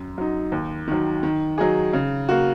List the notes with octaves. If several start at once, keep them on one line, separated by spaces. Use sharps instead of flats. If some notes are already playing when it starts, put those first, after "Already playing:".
Already playing: F#2
F#3 D#4
D#2
D#3 F#3
D#3
F#3 D#4 G#4
C#3
A#3 F#4